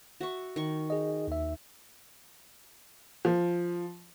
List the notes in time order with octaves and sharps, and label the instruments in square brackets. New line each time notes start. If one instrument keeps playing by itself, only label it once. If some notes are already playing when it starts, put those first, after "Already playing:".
[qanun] F#4 E5 C#6
D#3 C#6
[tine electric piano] G#4 D#5
D#2 E5
[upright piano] F3